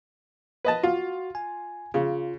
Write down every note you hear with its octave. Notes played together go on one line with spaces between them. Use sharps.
B4 D#5 A5
F4 F#4
G#5
C#3 F4